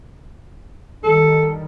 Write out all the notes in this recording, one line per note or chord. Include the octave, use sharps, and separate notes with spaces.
D#3 G3 A4